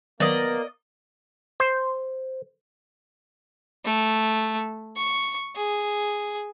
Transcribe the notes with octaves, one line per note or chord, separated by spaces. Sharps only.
D#3 F#3 A#3 B3 D5 D#5
C5
A3
C#6
G#4